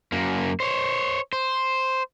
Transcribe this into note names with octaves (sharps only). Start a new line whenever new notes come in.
F#2 A#3
C5 C#5
C5